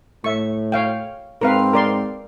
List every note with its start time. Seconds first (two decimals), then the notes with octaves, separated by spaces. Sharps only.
0.24 A2 E5 C#6
0.72 C#5 F5 G5
1.41 G#2 C4 A#4 B4 F5
1.73 A#4 D5 C6